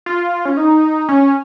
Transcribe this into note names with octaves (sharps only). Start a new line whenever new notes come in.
F4
C#4
D#4
C#4